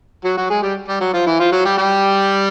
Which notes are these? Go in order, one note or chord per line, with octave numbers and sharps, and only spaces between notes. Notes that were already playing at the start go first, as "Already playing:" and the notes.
F#3 F#4
F#3 F#4
G#3 G#4
G3 G4
G3 G4
F#3 F#4
F3 F4
E3 E4
F3 F4
F#3 F#4
G3 G4
G3 G4